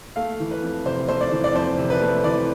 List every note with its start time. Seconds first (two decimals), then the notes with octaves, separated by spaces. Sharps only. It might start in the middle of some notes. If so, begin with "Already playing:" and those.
0.16 A3 F5
0.40 E3
0.51 B4
0.63 F2
0.85 C3 C5
1.08 A3 C5
1.21 D5
1.32 E3
1.44 D5
1.55 F2 C5
1.78 C3
1.90 B4
2.01 A3
2.24 E3 D5